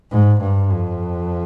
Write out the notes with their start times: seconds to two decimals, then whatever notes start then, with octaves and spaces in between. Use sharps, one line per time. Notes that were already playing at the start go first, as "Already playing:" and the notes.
0.11 G#2
0.41 G2
0.72 F2